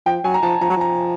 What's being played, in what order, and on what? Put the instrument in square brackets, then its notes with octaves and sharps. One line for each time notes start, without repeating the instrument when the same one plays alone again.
[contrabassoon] F3 [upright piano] G5
[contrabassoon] F#3 [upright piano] G#5
[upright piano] A#5
[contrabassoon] F3 [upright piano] A5
[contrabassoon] F3 [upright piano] A#5
[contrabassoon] F#3
[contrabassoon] F3 [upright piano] A#5